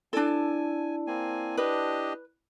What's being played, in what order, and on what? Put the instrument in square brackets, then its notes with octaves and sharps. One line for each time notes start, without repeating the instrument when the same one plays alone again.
[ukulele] D4 A4 [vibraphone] E4 D5 A5 [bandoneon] G#5
[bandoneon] A#3 C4 G#5
[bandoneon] D4 G4 D#5 [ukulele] B4